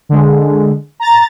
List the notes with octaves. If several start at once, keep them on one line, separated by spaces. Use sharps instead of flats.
D3 G#3
A#5 A6